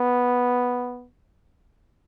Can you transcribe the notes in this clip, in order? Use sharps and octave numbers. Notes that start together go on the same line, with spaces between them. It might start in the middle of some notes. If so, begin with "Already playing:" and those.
Already playing: B3